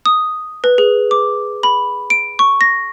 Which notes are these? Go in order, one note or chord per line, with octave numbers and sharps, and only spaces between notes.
D#6
B4
G#4
D6
B5
D7
C#6
A#6